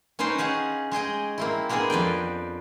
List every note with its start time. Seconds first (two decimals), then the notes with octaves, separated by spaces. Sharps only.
0.19 C#4 D#4 B4 C5 G5 C6
0.38 C#4 G#4 F5 F#5
0.92 G#3 G#4 D#5 G5
1.38 A#3 C4 E4
1.69 G#3 A#3 B3 D4 G#4
1.90 F2 B4 D5 G5